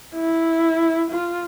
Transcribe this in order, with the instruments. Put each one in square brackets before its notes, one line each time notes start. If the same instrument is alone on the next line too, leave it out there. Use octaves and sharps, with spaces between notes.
[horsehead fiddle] E4
F4